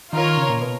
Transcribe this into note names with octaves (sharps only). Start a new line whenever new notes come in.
D#3 F4 A#4 C#5
D#3
C#3
A#2
B2